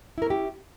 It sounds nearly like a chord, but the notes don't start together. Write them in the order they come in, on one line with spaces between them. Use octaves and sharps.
E4 A#4 C#4 G4